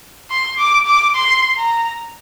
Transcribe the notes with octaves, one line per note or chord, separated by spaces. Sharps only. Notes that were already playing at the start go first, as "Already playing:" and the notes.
C6
D6
D6
C6
A#5